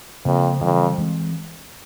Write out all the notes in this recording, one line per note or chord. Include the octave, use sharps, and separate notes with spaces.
F2 C#3 F3 A#3
F2 C#3 E3 G3
E3 G#3 C4